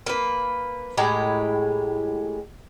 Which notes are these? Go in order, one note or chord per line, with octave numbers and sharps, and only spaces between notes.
A#3 B4
A2 G#3 G4 A#5